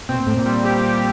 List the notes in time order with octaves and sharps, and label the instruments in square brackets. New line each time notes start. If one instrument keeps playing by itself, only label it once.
[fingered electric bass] B2 [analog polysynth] C4
[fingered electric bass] A#2
[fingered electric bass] A2 [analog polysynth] C4
[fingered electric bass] A#2
[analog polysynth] G3
G4
G3